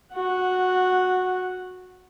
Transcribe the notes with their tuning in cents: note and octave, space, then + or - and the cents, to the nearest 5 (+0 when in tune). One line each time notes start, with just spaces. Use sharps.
F#4 -15 F#5 +0